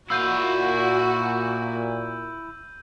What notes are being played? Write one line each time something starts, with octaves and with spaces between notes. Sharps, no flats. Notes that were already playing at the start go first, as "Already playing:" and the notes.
A#2 E4 F#4 F5 E6 G6 D#7